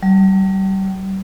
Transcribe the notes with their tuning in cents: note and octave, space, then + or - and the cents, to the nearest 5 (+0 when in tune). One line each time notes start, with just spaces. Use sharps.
G3 -35